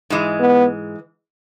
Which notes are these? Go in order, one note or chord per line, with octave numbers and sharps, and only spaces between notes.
G#2 E3 G#3
B3